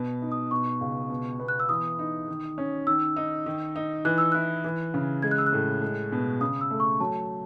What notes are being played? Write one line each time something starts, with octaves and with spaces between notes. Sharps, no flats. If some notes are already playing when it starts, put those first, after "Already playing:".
Already playing: B2 B3
D#4
D#6
B2 C#6
C#2
B2
B3
F#6
E6
E3 D#6
D#4
D#3
C#4
D#3 E6
D#4
D#3
D#4
E3 F#6
E6
E4 F#6
E3
C#3
G#3 G#6
F#6
E6
F#6
A2
G#3
B2
C#3 D#6
E6
A3
C#6
F#3 A5